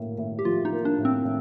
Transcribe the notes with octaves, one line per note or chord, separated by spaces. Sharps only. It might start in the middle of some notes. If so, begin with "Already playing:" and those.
Already playing: A2 A#3
A2
G4
F3 F4
D#4
A#3
D4
A2
C4
A2